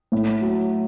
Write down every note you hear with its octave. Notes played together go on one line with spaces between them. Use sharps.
A2
F#3